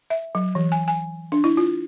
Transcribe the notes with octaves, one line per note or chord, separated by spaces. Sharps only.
E5
F#3
E3
G#5
G#5
D4
E4
F4